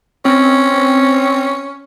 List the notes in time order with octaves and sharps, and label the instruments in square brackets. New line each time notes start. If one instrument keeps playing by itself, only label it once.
[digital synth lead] C4 [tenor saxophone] C#4